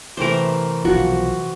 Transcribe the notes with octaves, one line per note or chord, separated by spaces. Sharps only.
C3 E3 A3 A#4 C5
B1 F3 F#4